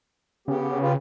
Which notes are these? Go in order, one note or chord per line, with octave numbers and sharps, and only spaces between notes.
C#3 B3 G4
F4 G4 B4